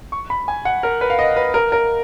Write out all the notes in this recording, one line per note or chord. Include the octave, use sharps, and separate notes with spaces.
C#6
B5
G#5
F#5
A#4
B4
F5
D#5
B4
A#4
A#4